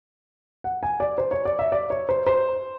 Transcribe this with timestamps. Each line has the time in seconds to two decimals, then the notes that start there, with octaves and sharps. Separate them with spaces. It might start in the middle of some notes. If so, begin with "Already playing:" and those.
0.64 F#5
0.83 G#5
1.00 D5
1.18 C5
1.31 C#5
1.45 D5
1.59 E5
1.72 D5
1.90 C#5
2.09 C5
2.27 C5